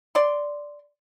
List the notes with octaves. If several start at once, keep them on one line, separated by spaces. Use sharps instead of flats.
D5 C6